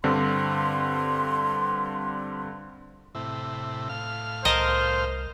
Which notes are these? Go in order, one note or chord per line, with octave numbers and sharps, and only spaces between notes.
G2 D3 C4 C6
A2 C3 E4
A2 F5 F6
C2 A#4 C5 D#5 A5